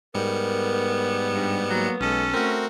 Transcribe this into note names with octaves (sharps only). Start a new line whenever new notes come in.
G#2 G3 B3 A#4 C#7
G2
F#3 A#3
B1 G#3 C#4 A4
A3 C4 F#4 A#4